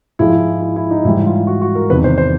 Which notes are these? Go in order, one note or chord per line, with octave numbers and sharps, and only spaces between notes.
G#2 F3 G#3 E4
E4
E4
D#4
G#2 E3 G3 E4
F4
F#4
F#4
A#4
E2 C3 D#3 B4
C5
C5